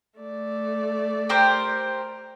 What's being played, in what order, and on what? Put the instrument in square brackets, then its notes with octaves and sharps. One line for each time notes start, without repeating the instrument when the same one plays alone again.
[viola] A3 D5
[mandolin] G4 A#4 C5